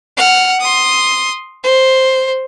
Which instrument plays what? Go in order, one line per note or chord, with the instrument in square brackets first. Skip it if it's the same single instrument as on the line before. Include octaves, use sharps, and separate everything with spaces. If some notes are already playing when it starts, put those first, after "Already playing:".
[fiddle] F#5 F6
C6 D#6
C5